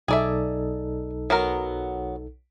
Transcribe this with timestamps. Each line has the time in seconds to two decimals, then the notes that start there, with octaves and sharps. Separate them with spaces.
0.08 B1 D#4 G#4 A4 D5 E5
1.30 F#3 B3 A#4